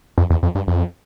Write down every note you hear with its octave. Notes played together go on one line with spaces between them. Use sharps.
F2
E2
F2
G2
F2